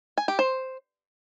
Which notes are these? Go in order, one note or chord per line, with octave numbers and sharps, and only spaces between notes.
G#5
G4
C5